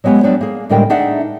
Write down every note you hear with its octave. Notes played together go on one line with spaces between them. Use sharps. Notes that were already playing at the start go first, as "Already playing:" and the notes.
F#3 G#3 B3 G4 C#5
F#3 G3 B3 D4
A#3 G#4
A2 D3 G3 G#3 A#4 G5
A3 D4 D#4 G#4 E5 F#5